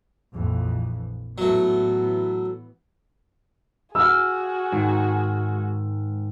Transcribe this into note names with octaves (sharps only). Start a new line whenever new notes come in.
A#1 F2 E3
A2 E3 F#3 A3 B3
F#4 G#4 E6 F6
G#2 D#3